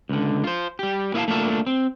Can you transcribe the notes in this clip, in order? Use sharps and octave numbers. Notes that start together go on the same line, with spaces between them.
C#2 D3
F4 C5
G3 G4
A#3 E4 C5 D#5 F5 A5
A3 A#3 D4 F4 E5
C4